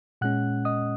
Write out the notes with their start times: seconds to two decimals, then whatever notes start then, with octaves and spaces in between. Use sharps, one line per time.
0.21 A#2 G#3 C#4 F#5 F#6
0.65 D#5 D#6